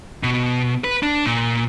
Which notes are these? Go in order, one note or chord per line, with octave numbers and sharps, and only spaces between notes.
B2
B4
D4
A#2